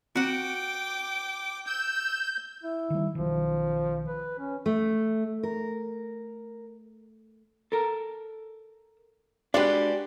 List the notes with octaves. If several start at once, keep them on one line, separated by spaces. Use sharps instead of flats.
C4 F#4 F#5 G5 D6
E6 G6
E4
D#3 G3
B1 D#3 F3
B4
C#4
A3
A#4
A4 A#4
G#3 D4 F#4 G4 B4 D5